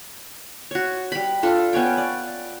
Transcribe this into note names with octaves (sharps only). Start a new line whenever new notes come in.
F#4 C#5
G3 B5
D4 F4 A4
B3 C#4 C#5 G5
D5